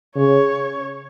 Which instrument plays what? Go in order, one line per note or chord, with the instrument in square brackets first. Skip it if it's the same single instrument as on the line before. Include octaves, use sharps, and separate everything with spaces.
[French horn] C#3 [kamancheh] C#5